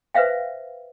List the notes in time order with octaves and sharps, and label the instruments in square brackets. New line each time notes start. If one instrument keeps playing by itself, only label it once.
[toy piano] B4 C5 E5 F5 G5